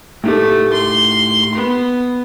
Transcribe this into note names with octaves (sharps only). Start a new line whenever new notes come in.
A2 A3 D#4 G4
C6
B3